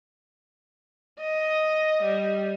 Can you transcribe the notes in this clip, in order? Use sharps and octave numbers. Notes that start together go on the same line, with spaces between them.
D#5
G3